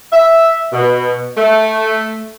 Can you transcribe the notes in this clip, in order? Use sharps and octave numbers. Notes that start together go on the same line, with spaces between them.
E5
B2
A3